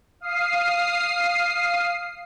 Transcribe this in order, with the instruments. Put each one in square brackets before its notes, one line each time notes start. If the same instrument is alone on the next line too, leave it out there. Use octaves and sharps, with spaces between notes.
[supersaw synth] F5 D#6 C7